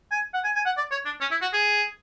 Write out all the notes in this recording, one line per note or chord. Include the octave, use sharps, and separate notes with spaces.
G#5
F#5
G#5
G#5
F#5
D5
C#5
D4
C#4
E4
F#4
G#4